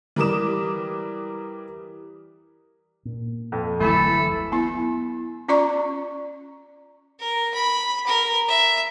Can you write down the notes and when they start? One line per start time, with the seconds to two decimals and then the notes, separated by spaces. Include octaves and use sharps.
0.16 E3 G3 A#4 D6 D#6 E7
3.05 A#2
3.52 F2
3.80 F#1 D2 E3 F#3 A3 A4 B5
4.52 B3 E4
5.49 C#4 F4 D5 A#5 C#6
7.19 A#4
7.54 B5
8.07 A#4
8.48 E5